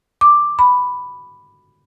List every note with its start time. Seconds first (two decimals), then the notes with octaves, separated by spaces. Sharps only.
0.21 D6
0.59 B5